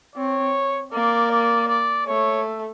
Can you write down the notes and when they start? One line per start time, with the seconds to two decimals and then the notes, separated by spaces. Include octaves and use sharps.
0.16 C4 C#5
0.92 A#3 D5
1.31 D5
1.68 D5
2.07 A3 C#5